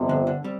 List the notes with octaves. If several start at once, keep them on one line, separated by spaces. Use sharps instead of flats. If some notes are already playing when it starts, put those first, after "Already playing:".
Already playing: G1 F2 C3
D3
D3
G3 C4